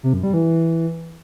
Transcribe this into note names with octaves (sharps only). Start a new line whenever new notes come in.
C3
F#2
G3
E3